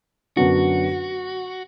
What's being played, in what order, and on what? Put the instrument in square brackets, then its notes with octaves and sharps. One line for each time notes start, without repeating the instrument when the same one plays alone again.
[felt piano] F#2 D3 F#3 B3 D4 [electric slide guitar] F#4